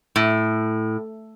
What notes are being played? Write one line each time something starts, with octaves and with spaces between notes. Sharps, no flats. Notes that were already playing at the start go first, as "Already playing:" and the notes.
A2